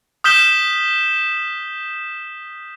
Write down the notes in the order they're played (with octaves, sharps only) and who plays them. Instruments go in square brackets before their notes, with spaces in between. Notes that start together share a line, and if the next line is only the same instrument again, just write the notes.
[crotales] D#6 F6 G6 B6 E7 G7